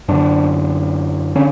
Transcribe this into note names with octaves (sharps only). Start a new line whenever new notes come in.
F#2 D3 D4
D3 C#4